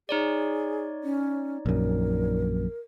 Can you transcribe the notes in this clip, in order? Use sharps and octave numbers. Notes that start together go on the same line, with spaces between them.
D#4 G#4 C#5 D5
C#4
A#1 F#2 A#4